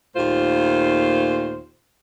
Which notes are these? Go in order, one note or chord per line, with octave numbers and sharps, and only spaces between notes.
D#2 A#2 A3 F4 C5